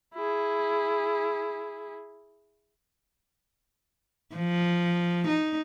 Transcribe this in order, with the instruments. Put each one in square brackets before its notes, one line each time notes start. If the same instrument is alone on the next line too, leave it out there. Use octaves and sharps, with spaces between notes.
[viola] E4 G#4
[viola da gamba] F3
D#4